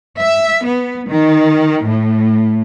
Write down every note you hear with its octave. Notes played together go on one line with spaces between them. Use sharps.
E5
B3
D#3
A2